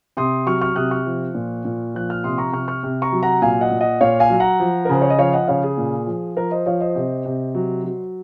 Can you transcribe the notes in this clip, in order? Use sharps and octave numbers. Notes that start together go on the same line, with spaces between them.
C3 C6 D#6
F#3 C#6 F6
C#6 F6
C3 D#6 F#6
C#6 F6
F3
A#2
A#2
F3 F#6
F6
C3 C6 D#6
A#5 C#6
C3 C#6 F6
C#6 F6
C3
A#5 C#6
F#3
F#5 A#5
A#2 F5 G#5
D#5 F#5
A#2
D#5 F#5
A#2 C#5 F5
F5 G#5
F#3
F#5 A#5
F3
A#4
C#3 C5
C#5
D#5
F3 C#5 F5
D#5 F#5
C#3 C#5 F5
G#4
A#2
F3
F3 A#4
C5 D#5
F3 C#5 F5
C5 D#5
C3
C3
F#3
F#3